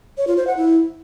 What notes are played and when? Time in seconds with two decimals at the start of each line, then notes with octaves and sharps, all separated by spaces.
0.17 C#5
0.27 F4
0.37 C5
0.47 F#5
0.57 E4